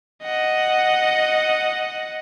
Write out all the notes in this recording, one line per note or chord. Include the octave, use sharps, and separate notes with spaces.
D#5 F#5